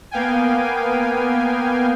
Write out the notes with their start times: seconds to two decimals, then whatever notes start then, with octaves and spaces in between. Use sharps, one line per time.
0.11 A#3 B3 F5 G5 G#5